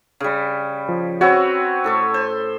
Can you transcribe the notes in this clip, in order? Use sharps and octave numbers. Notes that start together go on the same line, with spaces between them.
C#3 G3
F3
C4 F#4 B4 C#5 F#5 E6
A2 A4 C#6
C5